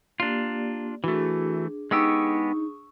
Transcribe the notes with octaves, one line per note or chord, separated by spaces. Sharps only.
A#3 D4 F4 G4 D5
E3 A3 D4 F#4 G#4
G#3 B3 D#4 G4 C#6 D#6 E6